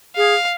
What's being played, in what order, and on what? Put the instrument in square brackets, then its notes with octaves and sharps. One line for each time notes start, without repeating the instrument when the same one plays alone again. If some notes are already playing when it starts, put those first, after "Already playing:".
[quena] G#4 [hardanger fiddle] F5